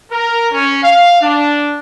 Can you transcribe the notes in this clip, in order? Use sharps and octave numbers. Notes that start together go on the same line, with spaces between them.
A#4
C#4
F5
D4